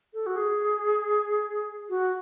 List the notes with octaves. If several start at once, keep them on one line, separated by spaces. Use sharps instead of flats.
A4
F#4
G#4
F#4